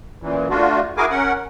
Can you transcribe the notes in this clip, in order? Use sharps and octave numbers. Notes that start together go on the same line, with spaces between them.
F#2 A#2 E3
A3 D4 F4 F#4
E4 F#4 G#4 A#4 G#5 D6
C#4 A#4 F#5